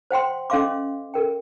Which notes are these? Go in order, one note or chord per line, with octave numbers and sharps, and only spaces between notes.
C5 F#5 G5 C6
C#4 A4 D#5 F5 C6 D6
A4 A#4 G5